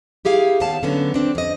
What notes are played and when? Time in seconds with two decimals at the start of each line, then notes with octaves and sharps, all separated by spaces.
0.25 E4 G4 G#4 F5
0.60 D#2 G3 B3 F5 A5
0.83 D3 F#3 B3 C#4
1.14 C4 D4
1.35 F2 D#5